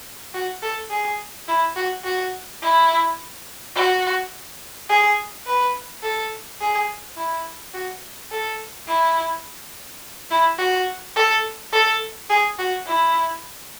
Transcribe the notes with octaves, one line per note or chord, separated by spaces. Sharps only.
F#4
A4
G#4
E4
F#4
F#4
E4
F#4
G#4
B4
A4
G#4
E4
F#4
A4
E4
E4
F#4
A4
A4
G#4
F#4
E4